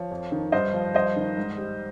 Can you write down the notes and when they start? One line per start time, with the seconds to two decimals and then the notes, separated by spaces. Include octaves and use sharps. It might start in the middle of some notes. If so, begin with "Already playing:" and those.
Already playing: F3 C#5
0.11 F2
0.32 D#3
0.52 G2 C5 D#5
0.74 F3
0.94 G2 C5 D#5
1.16 D#3
1.37 G#2
1.58 G3